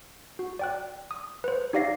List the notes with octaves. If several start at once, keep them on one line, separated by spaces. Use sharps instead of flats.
F#4
D5 G5 F#6
D#6
B4 C5
D#4 G4 D5 F5 A#6 C7